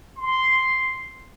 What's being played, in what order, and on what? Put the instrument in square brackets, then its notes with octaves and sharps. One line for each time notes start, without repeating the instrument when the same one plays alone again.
[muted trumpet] C6